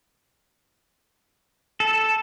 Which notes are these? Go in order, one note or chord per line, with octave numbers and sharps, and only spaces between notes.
A4